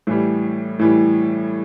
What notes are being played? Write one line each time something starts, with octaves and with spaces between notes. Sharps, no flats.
A2 E3 G3
A2 E3 G3